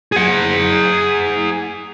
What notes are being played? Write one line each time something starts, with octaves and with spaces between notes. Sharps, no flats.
G#4 F#5